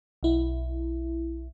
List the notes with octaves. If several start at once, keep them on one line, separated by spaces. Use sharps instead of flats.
B1 E4